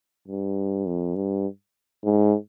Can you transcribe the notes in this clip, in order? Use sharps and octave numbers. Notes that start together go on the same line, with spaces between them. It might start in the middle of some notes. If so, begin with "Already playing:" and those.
G2
F2
G2
G#2